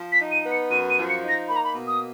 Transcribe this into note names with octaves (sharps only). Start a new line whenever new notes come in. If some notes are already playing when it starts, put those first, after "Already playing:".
Already playing: F3
B6
D#4
D#7
B3
C#7
F#2 D#7
D#7
F3
C#7
D#4
A#6
A#3 B5
A#5
B5
B2
D#6